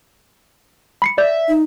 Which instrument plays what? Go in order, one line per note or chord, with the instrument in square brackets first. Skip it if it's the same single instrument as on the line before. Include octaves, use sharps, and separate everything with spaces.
[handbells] B5 C7 C#7
[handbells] D5 G6 [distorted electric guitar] E5
[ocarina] D#4